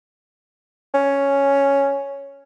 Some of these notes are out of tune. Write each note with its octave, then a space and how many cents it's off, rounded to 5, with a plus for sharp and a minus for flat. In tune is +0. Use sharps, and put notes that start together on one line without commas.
C#4 +5